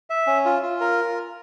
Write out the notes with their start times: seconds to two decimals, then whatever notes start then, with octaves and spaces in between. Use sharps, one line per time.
0.10 E5
0.27 C#4
0.45 F4
0.63 F4
0.81 A#4